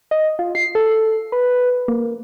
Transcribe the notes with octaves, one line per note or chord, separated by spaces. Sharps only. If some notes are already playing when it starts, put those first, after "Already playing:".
D#5
F4
C7
A4
B4
A#3